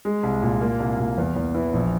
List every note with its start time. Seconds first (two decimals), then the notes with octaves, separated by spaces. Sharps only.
0.05 G#3
0.23 C2
0.42 A#2
0.61 A#3
0.80 C2
0.99 A#2
1.18 E2
1.36 E2
1.54 E3
1.73 A#1